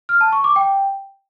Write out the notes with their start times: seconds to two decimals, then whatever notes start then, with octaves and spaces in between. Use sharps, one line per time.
0.09 F6
0.21 A5
0.32 C#6
0.44 D6
0.56 G5